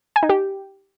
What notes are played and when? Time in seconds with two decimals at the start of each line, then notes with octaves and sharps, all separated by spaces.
0.16 G#5
0.23 D#4
0.29 G4